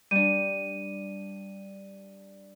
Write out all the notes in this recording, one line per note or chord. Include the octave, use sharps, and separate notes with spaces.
G3 D4 D#7